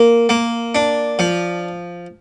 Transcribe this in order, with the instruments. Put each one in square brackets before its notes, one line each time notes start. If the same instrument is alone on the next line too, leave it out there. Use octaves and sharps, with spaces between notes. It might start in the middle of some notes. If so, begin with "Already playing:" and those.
Already playing: [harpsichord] A#3
A#3
D4
F3